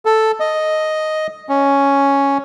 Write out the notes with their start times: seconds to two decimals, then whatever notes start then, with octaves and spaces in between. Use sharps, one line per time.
0.05 A4
0.40 D#5
1.49 C#4